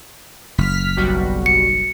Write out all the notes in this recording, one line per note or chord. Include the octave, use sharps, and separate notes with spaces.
F#1 F6 B6
B1 G3 F#4
C#7